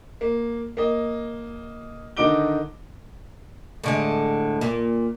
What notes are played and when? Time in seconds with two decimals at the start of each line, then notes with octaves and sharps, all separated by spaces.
0.21 A#3
0.77 A#3 D#5
2.17 D3 D#3 D#4 D6 D7 G7
3.84 A2 D3 G#3
4.61 A#2